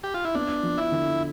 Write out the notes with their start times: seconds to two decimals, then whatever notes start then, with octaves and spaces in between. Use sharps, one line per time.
0.03 G4
0.14 F4
0.25 E4
0.35 B3 D4
0.63 F3
0.78 E4
0.92 D3